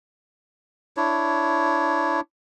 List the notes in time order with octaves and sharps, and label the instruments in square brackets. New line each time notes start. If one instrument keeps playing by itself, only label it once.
[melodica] D4 E4 C#5